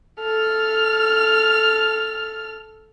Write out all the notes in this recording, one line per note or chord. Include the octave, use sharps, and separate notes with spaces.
A4 F6